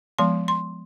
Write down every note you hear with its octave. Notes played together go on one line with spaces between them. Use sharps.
F3 G#3 B3 C6
C6